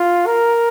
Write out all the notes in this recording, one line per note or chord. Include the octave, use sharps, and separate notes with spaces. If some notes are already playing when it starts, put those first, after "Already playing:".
Already playing: F4
A#4